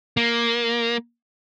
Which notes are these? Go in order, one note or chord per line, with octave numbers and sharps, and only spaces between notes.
A#3